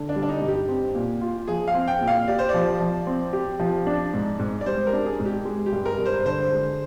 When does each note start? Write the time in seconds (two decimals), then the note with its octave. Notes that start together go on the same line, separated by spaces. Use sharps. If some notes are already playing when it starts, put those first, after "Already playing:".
Already playing: D3
0.09 D4
0.16 G3
0.23 D4
0.28 D#4
0.42 G2
0.48 G4
0.69 C4
0.95 A#2
1.21 F4
1.47 F3 G#4
1.68 F5
1.74 C4
1.88 G5
2.01 A#2
2.08 F5
2.28 G4 D5
2.39 C5
2.49 D5
2.54 F3
2.81 F3
3.07 C4
3.33 G4
3.60 F3
3.87 D4
4.14 G#2
4.39 G#2
4.61 D5
4.66 G3 C5
4.87 A#4
4.93 D4
5.06 G#4
5.20 G#2
5.25 G4
5.45 G#3
5.66 G4
5.72 G2
5.85 A#4
5.98 G2
6.06 C5
6.25 D3 C5
6.52 G#3